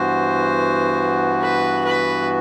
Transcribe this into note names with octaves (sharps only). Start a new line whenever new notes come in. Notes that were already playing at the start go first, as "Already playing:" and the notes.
Already playing: G2 E3 B3 F#4 C5
B4
B4